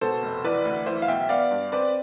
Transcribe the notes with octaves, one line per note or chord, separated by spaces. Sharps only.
B2 A4 C5
F1
E3 B4 D5
D2
E3 C5 E5
F5
B1 E5 G5
B3 D5 F5
G2
C4 B4 D5